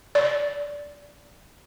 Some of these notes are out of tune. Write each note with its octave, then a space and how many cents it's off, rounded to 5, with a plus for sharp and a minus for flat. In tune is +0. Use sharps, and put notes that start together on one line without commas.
D5 -15